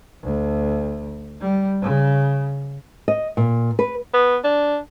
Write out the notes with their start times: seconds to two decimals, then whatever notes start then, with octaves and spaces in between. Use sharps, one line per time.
0.23 D2
1.41 G3
1.82 C#3
3.08 D#5
3.37 A#2
3.79 B4
4.14 B3
4.44 D4